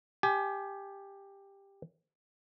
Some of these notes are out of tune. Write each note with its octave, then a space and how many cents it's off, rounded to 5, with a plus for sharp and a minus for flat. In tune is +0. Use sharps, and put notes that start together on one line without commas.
G4 +10 G#5 +30